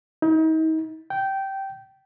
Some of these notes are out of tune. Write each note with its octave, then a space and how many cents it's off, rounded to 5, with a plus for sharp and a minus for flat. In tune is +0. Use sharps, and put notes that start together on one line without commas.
D#4 +40
G5 -15